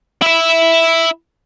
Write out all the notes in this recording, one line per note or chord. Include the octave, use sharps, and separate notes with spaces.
E4 E5